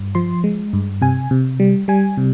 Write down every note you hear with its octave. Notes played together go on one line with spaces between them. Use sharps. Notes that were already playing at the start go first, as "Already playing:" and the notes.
Already playing: G2
F3 C6
G#3
G2
C3 G#5
C3
G3
G3 G#5
C3